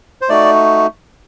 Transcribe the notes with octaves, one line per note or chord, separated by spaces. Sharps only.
C5
A3 D#4 F#4 D5